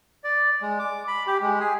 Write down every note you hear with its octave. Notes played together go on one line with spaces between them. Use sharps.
D5
G#3
D6
B5
G4
G#3
G#4